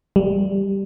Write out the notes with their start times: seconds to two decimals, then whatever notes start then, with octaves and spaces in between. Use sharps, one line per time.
0.16 G3